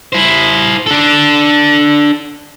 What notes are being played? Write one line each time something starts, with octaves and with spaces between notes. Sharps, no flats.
E4 C5
D4 A4